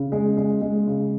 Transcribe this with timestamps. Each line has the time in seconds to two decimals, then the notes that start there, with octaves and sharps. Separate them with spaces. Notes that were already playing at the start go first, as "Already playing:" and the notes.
Already playing: C#3
0.12 G#3
0.37 G#3
0.62 G#3
0.87 C#3